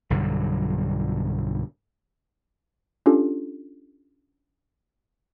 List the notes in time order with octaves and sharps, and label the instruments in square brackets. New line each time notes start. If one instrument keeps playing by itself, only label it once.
[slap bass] B1 G2 D3 F#3
[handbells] C#4 D4 F4 G4 A4